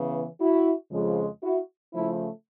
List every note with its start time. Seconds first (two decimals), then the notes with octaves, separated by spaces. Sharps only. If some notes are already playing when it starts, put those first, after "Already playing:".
Already playing: C#3 E3 B3
0.41 E4 F#4
0.91 F2 C#3 F3 G#3
1.42 E4 F#4
1.93 C#3 F3 A3 E4